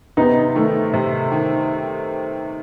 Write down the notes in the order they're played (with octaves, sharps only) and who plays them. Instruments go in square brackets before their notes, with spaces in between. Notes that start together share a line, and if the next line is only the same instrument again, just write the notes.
[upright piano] C3 [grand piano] B3 D#4
[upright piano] D#3 A3
C3
D#3